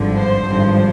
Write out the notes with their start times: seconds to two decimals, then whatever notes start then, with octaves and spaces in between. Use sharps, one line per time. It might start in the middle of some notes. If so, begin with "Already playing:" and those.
Already playing: G#1 G2 D3 F3
0.18 C5
0.48 G#1 G2 F3